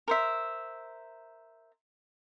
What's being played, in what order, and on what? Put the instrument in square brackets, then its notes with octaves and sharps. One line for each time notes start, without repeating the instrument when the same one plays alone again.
[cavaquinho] A#4 C5 E5